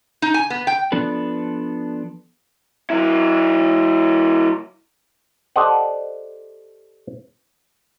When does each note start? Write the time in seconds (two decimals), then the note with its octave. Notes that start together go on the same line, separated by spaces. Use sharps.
0.22 D#4
0.34 G#5
0.50 B3
0.67 G5
0.92 F3 B3 D4 A4 B4
2.90 F#3 E4
5.56 G4 A4 C5 D5 D#5 F#5